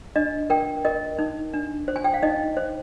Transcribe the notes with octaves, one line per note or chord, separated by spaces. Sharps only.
D4 D#5
A#4 G5
A#4 D#5
D#4
D4
C5
G#5
G5
F5
D#4 D#5
C5